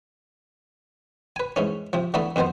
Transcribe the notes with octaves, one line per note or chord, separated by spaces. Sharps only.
B4 G#5
G#2 E3 C#4
C3 F3
D3 E3 A3 B3 A4 B5
F2 B2 D#3 B3 C5